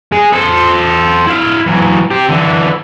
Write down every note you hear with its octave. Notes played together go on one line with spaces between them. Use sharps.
G#3 G#4
A4 C5
E4 F5
E3 F#3
G4 C5
D3 E3